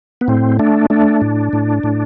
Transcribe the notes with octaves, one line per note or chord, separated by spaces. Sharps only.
B3
A2 C4
A3 D4
A3 D4
A2
A2
A2